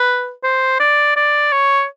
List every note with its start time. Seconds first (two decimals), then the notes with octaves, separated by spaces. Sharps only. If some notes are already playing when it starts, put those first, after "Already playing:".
Already playing: B4
0.43 C5
0.80 D5
1.16 D5
1.52 C#5